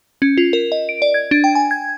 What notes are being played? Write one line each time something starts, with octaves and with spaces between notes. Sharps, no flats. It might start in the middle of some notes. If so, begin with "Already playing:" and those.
C#4
F4
A#4
D#5
D7
D5
G#6
D4
G5
G#5
G#6